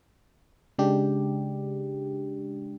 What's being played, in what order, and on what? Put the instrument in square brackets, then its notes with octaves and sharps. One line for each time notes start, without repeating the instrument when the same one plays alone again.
[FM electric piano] C#3 G#3 D4 G4